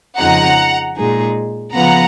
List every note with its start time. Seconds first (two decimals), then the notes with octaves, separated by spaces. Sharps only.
0.18 F2 C#3 F3 G#3 D#4 F#5 A#5
0.96 A#2 G#3 D#4 G#4
1.73 C#3 F3 B3 F4 B4 F#5 A#5